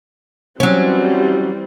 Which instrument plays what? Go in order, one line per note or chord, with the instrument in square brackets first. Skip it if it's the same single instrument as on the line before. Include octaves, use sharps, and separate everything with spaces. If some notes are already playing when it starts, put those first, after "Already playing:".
[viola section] E3 G3 C4 [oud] F#3 C#4